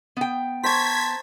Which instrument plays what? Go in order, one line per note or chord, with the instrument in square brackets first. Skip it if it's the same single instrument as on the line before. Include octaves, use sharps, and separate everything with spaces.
[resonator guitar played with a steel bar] B3 G5
[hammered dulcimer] C5 A#5 C#6 [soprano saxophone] A5 [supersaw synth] G#6 B6